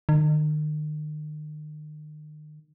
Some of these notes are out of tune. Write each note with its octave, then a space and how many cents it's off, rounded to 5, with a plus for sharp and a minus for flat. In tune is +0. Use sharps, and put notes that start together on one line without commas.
D#3 -40